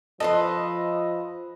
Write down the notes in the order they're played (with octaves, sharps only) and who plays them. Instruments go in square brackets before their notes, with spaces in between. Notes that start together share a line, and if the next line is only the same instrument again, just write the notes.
[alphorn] F3 [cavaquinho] A4 B4 C6 [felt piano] D#5